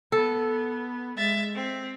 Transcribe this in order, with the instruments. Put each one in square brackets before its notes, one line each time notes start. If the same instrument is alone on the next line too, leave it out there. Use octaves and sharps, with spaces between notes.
[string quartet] B3 [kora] A4
[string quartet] G#3 E5 A6
C4